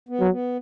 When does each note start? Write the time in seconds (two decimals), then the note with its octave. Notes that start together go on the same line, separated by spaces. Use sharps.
0.09 B3
0.20 F#3
0.31 B3